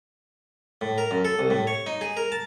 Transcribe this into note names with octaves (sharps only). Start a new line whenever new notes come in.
A2
A#4
F#2
A4
C2
A2
C#5
D#4
G#4
A#4
A5